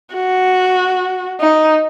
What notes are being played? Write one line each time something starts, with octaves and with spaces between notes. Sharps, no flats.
F#4
D#4